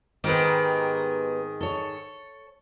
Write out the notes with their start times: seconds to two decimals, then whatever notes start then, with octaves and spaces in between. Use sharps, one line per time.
0.24 G#2 D#3 B3 G4 B4
1.61 A4 C#5